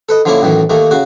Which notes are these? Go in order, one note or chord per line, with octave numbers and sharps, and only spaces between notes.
A4 B4 D#5
D3 F3 A#3 C#4 E4
F#2 A2 D#3 E3
D#2 D#3 A3 A#3
C#3 F#4